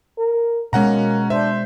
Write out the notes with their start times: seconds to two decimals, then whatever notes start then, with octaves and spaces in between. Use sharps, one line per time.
0.18 A#4
0.73 B2 G#3 A#3 C#4 F#5 A#5
1.30 D4 C5 E5